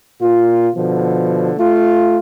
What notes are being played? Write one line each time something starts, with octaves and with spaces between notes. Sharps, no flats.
A#2 F4
B2 D3 F3
A3 F4